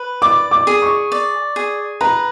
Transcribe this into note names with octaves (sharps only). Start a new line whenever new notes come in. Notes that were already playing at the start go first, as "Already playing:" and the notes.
Already playing: B4
D5 D6
D6
G#4
C#6
D5
G#4
B4 A#5